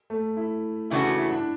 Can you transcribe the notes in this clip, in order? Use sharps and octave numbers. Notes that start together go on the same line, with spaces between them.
A3
E4
C#3 E3 A3 D4 E4 F#4
E4
E4
D4